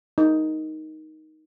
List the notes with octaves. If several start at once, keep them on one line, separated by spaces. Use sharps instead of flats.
D#4